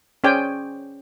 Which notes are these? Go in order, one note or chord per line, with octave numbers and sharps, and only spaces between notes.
C#4 G#4 C5 D5 G5 G#5